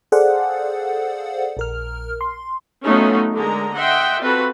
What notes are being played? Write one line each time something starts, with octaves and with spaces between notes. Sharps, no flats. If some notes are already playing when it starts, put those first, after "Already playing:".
G#4 A4 C5 D5 F5 F#5
A#1 A#4 F6
C6
F#3 A3 B3 C#4 D#4 F4
D3 G#3 A#4 A#5
D#5 E5 F#5 G5 C6
C4 F4 F#4 A4 B4